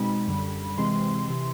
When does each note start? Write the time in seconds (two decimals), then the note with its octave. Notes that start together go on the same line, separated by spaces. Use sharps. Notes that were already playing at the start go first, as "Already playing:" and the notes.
Already playing: B2 G#3 C4 D#4 B5
0.27 F#2 D3 G3
0.77 C3 E3 G#3 C4 C6
1.28 C3 E3